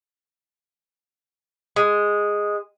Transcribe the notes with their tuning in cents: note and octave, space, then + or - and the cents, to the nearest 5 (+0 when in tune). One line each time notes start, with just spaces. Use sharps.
G#3 -5